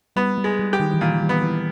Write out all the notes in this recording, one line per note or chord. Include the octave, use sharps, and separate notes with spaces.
G3 B3
G3
G#3
G3
G4
D#3
E3
A#2 D#3
E3
G3
B3
E3